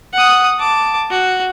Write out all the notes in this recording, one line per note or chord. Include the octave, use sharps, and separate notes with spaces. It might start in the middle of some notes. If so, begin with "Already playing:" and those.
F#5 D#6
A5 D6
F#4